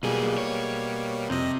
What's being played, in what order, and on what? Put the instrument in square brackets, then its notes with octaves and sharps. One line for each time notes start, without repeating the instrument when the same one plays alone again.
[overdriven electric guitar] B1 G#4 [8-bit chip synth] B2 G3 A#3
[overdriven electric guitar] C#5
[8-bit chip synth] F2 D#5 [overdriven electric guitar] C3